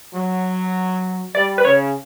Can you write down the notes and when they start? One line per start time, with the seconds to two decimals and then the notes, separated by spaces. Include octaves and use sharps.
0.15 F#3
1.35 G3 D5
1.58 B4
1.64 C#3 C#5